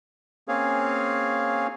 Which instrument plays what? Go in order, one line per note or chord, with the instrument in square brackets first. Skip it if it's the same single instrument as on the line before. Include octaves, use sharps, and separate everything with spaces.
[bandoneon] A#3 C4 C#4 G#4 C#5 F5